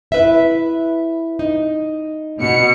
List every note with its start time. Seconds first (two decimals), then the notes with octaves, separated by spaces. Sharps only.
0.12 E4 B4 E5
1.39 D#4
2.39 B2 C#7